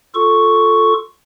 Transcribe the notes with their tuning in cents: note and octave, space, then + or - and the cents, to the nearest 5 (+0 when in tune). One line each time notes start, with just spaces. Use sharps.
F4 +5 A4 +0 C#6 +0